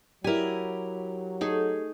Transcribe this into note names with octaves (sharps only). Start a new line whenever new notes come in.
F#3 E4 G4 A#4 D5 G#5
A3 D#4 G#4 A4